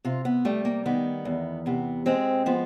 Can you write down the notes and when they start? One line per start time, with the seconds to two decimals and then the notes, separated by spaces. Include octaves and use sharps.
0.05 C3 F4
0.25 B3
0.45 G3 A3
0.65 A#3
0.86 D#3 B3
1.25 E2
1.66 C3 B3
2.06 G#3 C4
2.46 F3 B3